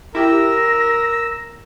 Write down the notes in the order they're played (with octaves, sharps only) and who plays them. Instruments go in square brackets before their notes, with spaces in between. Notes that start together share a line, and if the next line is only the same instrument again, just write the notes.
[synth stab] E4 G4 [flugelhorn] A#4 [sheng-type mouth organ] E6 [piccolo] A#6